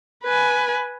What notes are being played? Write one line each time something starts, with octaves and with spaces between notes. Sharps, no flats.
B4 G#5